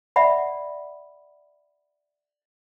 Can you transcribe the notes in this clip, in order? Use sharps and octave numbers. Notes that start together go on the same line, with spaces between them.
D5 E5 F#5 B5